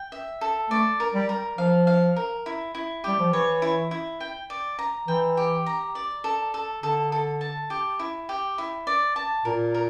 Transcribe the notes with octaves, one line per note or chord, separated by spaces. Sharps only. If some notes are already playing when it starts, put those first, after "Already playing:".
Already playing: G5
E5
A4
A3 D5
A#4
G3
A#4
F3 F5
F5
A#4
E4
E4
G3 G4
F3
E3 C#5
E4
E4
G5
D5
A#5
E3 G5
G4
A#5
D5
A4
A4
D3 A4
A4
A5
G4
E4
G4
E4
D5
A5
A#2 A#4
A#4